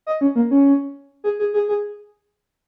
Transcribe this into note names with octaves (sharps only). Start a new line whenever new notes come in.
D#5
C#4
A#3
C#4
G#4
G#4
G#4
G#4